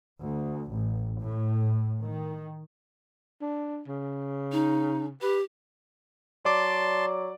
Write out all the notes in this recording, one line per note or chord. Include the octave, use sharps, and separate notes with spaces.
D2
A1
A2
D#3
D4
C#3
D#4
G4 B4
F#3 D5 A5 C6 D6